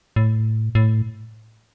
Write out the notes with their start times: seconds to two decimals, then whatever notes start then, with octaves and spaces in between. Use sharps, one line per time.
0.16 A2
0.75 A2